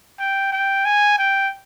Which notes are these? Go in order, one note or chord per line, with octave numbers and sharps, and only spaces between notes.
G5
G5
G#5
G5